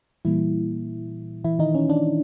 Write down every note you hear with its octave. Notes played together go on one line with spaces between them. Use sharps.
A#2 E3 G3 A#3 E4
E3 E4
D#3 D#4
C#4
D4